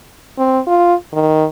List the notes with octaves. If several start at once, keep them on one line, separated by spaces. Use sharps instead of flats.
C4
F4
D#3